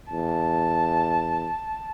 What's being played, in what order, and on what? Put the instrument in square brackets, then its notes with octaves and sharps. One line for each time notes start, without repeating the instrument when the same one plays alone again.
[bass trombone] E2 [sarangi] A5